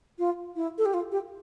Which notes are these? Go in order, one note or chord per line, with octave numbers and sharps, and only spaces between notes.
F4
E4
A4
G4
F4
G4